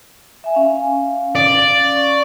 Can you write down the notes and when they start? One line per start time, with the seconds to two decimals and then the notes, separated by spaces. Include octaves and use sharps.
0.44 E5 G#5
0.55 C#4 F5
1.35 D5
1.96 C#6